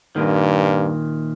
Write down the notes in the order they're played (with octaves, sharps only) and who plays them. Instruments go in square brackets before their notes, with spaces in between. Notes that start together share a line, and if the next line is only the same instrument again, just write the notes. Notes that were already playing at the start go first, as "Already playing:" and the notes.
[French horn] G2 [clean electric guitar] A#2 D#3